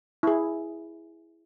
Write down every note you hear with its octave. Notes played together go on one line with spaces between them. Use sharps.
E4 G#4